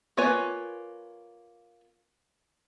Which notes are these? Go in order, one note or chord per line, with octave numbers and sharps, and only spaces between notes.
A#3 F4 B4 C#5 G#5